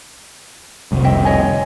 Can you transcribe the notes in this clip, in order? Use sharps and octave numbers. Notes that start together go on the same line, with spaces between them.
F1 C2
D#5 E5 G5
C#5 D#5 G#5